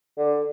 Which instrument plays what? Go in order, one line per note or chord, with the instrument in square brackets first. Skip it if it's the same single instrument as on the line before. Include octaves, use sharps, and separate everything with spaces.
[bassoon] D3